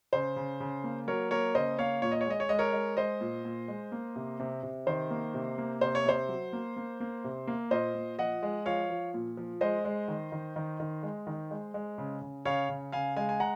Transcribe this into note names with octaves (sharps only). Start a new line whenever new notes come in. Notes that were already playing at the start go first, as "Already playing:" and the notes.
C#3 C5
C#3
C#3
A#3
F#3 A#4 C#5
A#3 A#4 C#5
C#3 C5 D#5
A#3 C#5 F5
A#2 C#5
D#5
C#5
G#3 D#5
C#5
G#3 D#5
A#4 C#5
G#3
G#3 C5 D#5
A#2
A#2
G#3
A#3
C3
C3
C3
D#3 C5
A#3
C3
A#3
C3 C5
C#5
C3 C5
F#3
A#3
A#3
A#3
C3
A#3
A#2 C5 D#5
A#2
F3 D#5 F#5
G#3
F3 C#5 F5
F3
A#2
F3
G#3 C5 D#5
G#3
D#3
D#3
D#3
D#3
G#3
D#3
G#3
G#3
C#3
C#3
C#3 C#5 F5
C#3
C#3 F5 G#5
G#3 F5 G#5
G#5
F#5 A#5